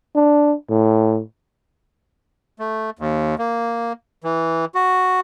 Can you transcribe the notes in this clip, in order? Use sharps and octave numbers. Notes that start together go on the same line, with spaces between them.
D4
A2
A3
D#2
A#3
E3
F#4